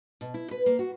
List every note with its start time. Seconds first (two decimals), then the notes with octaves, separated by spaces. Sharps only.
0.21 B2
0.34 E4
0.51 B4
0.66 A#3
0.79 F#4